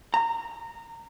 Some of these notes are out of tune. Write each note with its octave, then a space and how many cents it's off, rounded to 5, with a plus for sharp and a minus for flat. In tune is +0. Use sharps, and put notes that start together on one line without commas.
A#5 -20